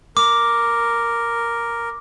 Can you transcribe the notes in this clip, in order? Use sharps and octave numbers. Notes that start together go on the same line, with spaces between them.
A#4 D6